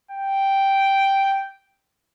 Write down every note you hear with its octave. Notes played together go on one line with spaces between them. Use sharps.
G5